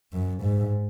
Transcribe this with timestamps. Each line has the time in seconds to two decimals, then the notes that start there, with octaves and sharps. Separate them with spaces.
0.13 F#2
0.43 G#2